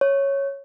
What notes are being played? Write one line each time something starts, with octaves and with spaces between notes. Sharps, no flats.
C#5